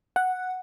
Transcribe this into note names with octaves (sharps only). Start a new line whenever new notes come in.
F#5